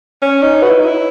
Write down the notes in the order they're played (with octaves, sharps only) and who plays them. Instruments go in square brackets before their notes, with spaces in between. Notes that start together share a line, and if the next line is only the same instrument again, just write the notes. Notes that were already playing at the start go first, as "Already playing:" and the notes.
[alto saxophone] C#4 [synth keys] C#5
[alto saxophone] D#4
[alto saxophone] F#4 [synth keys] B4
[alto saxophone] E4
D#4
E4